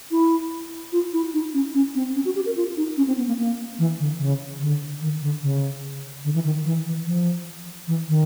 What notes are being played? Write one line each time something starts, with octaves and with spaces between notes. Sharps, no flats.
E4
F4
E4
D#4
C#4
C#4
C4
C#4
F#4
G4
A#4
F4
D#4
C#4
C4
B3
A#3
A#3
E3
D3
C#3
D3
D#3
D3
C#3
D3
E3
D#3
E3
E3
F3
E3
D#3